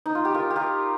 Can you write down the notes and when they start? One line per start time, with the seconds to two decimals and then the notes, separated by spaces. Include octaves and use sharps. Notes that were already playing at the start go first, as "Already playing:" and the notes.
0.06 D#4
0.15 F4
0.25 G4
0.34 F4 A#4
0.50 G4
0.56 F4 A#4